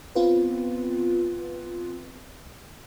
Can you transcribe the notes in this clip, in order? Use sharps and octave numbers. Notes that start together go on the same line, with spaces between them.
B3 C4 F4 B4